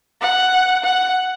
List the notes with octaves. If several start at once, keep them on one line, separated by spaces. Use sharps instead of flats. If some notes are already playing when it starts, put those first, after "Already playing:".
F#5
F#5